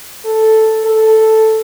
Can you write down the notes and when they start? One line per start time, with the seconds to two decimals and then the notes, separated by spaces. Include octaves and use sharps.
0.25 A4
0.85 A4